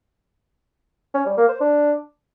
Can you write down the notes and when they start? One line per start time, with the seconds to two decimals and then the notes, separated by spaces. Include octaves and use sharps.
1.14 C#4
1.26 G3
1.37 A#3
1.49 C5
1.60 D4